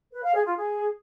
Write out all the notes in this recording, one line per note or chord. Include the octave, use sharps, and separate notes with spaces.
B4
F5
G#4
F4
G#4